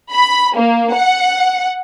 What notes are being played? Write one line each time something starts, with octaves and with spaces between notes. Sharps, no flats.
B5
A#3
F#5